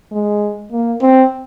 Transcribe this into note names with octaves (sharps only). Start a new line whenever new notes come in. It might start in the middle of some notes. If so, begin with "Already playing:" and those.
G#3
A#3
C4